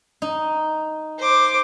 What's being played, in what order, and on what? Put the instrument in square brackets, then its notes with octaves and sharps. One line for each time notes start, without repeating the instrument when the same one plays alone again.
[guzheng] D#4
[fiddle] C5 D6